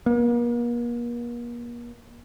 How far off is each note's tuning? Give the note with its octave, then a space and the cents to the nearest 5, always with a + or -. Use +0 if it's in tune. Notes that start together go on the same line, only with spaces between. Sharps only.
A#3 +40